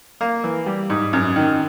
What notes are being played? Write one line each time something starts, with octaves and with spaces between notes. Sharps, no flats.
A#3
E3
G3
G#2
F#2
D#3